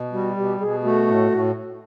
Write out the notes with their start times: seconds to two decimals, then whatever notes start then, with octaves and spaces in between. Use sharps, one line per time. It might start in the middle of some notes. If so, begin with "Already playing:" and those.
Already playing: B2
0.12 G3 F#4
0.37 B2 G4
0.60 B2 G#4
0.84 A3 F#4
1.07 A2
1.31 A2